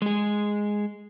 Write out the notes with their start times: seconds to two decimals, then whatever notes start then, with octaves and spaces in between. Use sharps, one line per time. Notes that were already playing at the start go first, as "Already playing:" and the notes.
0.02 G#3 G#4